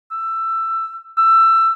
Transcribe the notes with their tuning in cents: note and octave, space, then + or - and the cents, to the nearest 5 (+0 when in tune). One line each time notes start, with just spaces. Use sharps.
E6 +15
E6 +20